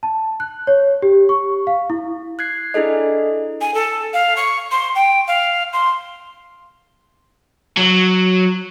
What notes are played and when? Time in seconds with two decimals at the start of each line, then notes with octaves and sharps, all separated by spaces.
0.03 A5
0.40 F#6
0.67 C#5
1.02 G4
1.29 C#6
1.67 F5
1.90 E4
2.39 F#6 G#6 C7
2.74 D4 E4 G#4 A4 D#5
3.61 G#5
3.74 A4
4.14 F5
4.37 C#6
4.71 C6
4.95 G5
5.28 F5
5.73 C6
7.77 F#3